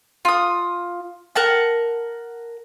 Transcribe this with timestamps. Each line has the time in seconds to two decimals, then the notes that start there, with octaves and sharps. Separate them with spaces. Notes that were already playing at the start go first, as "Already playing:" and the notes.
0.25 F4 D#6
1.35 A#4 F#5 A5